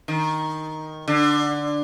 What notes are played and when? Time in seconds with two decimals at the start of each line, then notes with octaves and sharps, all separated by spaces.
0.08 D#3
1.08 D3